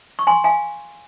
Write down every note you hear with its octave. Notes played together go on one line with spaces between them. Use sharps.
C#6
G#5 C6
F5 G#5